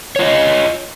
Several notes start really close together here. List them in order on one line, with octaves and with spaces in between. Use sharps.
C#5 F4 D#5